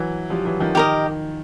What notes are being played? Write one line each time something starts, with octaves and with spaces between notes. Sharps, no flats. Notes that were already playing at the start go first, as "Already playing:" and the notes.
Already playing: E3 F#3
F3 G3
E3 F#3
D#3 F3
D#3 G4 A#4 D#5